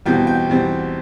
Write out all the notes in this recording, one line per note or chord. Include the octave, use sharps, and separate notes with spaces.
E2 B2 G3 C4 G5
G5
E2 B2 G3 C4